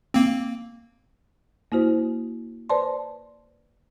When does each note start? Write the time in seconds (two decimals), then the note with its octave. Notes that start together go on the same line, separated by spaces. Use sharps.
0.14 A#3 C4
1.72 A#3 E4 F#4 C5
2.70 B4 C5 D5 A5 C6